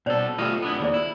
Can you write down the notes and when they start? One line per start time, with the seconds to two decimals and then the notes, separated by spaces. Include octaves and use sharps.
0.06 B2 C#4 A4 C5 D5
0.38 A3 F4 G4 D#5 F5 G5
0.62 B3 D4 E4
0.80 D#2 G#4 C5 D5
0.94 E4